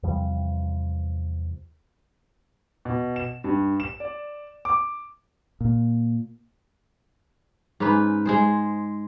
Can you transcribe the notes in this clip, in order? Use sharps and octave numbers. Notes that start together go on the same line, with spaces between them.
E2 C3 F3 G3
B2
E7
G2
E7
D5
D6
A#2
G#2 C#4 D#4 B4
G#3 G#4 C5